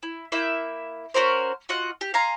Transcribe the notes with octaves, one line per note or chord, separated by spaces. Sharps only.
E4
A#3 E4 E5 G6
C#4 F#4 A#4 C5
F4 F#4 D#5 F#5
G4
F5 G#5 A#5 C6